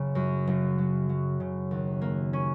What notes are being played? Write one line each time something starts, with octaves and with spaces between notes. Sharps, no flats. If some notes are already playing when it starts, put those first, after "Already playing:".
Already playing: F#1 C#3
F#2
F#1
F#3
F#3
C#3
D#2
A#3
C#4